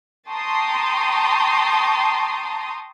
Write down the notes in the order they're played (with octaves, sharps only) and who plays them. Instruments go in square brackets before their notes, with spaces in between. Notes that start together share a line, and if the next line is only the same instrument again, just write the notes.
[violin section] G5 A5 A#5 C6 C#6 D#6